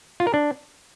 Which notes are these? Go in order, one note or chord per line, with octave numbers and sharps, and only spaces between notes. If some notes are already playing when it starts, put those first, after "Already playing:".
F4
A#4
D4